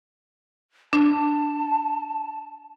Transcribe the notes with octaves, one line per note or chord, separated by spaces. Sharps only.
D4 A5